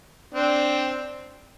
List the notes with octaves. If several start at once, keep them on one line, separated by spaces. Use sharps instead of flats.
C4 D4